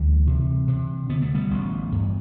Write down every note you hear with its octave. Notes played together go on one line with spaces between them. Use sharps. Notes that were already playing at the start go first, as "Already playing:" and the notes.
Already playing: D2 E3 G3
C3
C3
D3 B3
A3
G3 B3
A1
G2